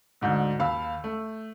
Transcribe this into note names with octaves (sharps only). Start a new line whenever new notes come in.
D2 G#2 D3 G6
D#2 F5 B5 E6
A3